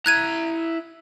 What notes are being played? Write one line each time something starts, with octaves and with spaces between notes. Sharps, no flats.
E4 A#5 F#6 G#6 D#7